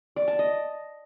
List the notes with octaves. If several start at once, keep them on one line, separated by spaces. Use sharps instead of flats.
D5
A5
D#5